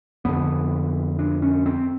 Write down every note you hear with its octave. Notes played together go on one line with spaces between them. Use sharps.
F2 D3 B3
D4
C#4
C4